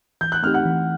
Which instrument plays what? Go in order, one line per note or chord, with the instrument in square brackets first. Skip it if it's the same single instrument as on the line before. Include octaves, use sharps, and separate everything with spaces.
[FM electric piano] E3 [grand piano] G6
[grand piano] F#6
[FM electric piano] A3 C4 D#4 G4 [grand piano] F6
[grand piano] F#5 F#6
[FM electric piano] E3